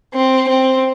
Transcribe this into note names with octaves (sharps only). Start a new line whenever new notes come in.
C4
C4